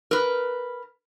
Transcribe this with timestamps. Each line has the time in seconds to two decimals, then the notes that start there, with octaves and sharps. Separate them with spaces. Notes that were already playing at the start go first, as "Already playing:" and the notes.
0.11 A#4 B4